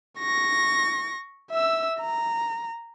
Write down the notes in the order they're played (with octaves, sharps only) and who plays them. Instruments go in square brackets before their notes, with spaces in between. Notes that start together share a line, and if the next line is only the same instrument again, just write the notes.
[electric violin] C#6 A#6
E5 E6
A#5